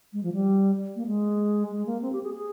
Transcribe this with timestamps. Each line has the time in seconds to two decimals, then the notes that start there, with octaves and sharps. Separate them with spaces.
0.13 G#3
0.23 F3
0.33 G3
0.96 A#3
1.07 G#3
1.71 G#3
1.86 A#3
2.02 C4
2.12 G4
2.23 G#4
2.34 G#4